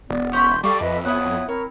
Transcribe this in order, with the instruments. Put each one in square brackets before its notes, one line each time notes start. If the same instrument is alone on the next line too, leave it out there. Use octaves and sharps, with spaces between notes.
[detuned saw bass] E1 [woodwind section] B3 [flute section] D5
[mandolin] C#4 E4 B5 [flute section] C6 G6
[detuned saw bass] G3 [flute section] A4 C#6 D6 [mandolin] D5 F5
[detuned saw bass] F2 [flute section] B4 D#5 [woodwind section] E5
[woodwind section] B3 [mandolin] E4 B4 F#5 [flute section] C#5 D#6
[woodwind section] C4 E4 [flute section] A#4 [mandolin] C#5